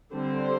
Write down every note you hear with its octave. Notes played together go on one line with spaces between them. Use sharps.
D3 G3 C4 C5